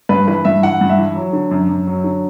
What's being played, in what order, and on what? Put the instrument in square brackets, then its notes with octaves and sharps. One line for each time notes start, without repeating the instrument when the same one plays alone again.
[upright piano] G2 B4
E3 B4
G2 E5
E3 F#5
G2
E5
E3
F#3
D3
F#2
F#2
F#3
D3